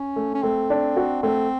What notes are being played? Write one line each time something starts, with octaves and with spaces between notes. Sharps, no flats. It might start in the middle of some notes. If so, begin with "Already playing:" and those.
Already playing: C#4
A3
C#4
A3 C4
D4
F#4
A3 C4